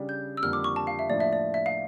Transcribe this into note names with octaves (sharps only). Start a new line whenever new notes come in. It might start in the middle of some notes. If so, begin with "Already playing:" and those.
Already playing: C#3 G3 D4 G4
G6
E6
F2 D3 G3 A#3 F6
D6
C#6
A5
F5
E5
A2 F3 A#3 D4 D5
E5
D5
E5
F5